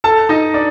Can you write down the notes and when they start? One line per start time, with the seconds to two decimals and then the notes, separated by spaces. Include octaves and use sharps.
0.04 A4 A5
0.29 D#4 D#5
0.54 D4 D5